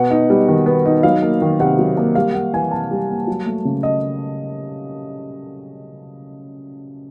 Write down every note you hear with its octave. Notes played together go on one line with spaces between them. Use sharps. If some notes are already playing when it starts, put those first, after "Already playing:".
Already playing: B2 B3 F#5
D#4
G3
D#3
B3
D#4
F#3 F5
A#3
D#3
C3 F#5
F#3
A#3
G3 F5
A#3 F#5
E3 G#5
C3 A5
G3
A#3
F#3
A3
C#3
D#5